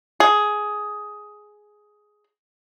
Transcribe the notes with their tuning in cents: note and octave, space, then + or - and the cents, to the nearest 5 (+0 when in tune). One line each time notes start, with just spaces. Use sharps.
G#4 +10